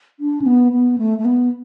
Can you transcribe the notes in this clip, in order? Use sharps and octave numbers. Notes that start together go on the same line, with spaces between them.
D4
C#4
B3
B3
A3
A3
B3